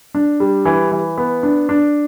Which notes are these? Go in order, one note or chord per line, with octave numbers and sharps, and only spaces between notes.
D4
G3
E3
E3
B3
D4
D4